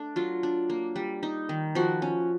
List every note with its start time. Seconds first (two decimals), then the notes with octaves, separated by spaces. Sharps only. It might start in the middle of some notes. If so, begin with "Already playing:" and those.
Already playing: A3 D4
0.16 F#3 F4
0.43 D4
0.70 A#3
0.96 G3
1.23 D#4
1.49 D#3
1.75 F3 F#4
2.02 C#4